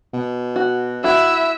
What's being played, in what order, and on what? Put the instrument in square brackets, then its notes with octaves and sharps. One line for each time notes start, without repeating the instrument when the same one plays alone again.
[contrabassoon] B2
[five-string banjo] F#4
[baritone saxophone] E4 [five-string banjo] F#4 [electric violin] E5